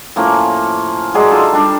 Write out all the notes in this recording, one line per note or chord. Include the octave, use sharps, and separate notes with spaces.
A2 F3 A#3 C#4
F#3 G#3 G#4 D5
D#4 F4 A4
G3 D4